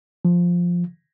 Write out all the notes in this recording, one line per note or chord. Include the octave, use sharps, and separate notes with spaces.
F3